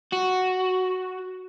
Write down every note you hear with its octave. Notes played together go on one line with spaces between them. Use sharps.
F#4